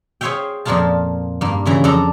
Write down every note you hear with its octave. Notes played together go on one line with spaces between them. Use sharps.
G#4 C5 C#5 E5 F5 G5
F2 A#2 F3 A#3 F4 A5
G2 A#3
F#2 C#3 E3 A#5
F2 D4 A4 D5 A#5